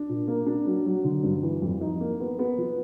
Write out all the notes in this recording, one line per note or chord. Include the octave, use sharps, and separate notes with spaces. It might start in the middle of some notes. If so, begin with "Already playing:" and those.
Already playing: D4
A#2
A#3
D4
F#3
F#3
D3
G2
E3
F2
D#4
A#3
B3
B3
F3